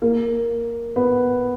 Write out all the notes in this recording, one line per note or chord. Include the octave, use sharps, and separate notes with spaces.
A#3
B3